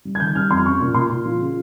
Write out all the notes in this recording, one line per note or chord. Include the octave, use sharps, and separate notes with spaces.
G3
G#6
D#3 G6
G3 F6
F2 C6
C#4 C#6
A#2
A#2 C6
A#2
F3
C#3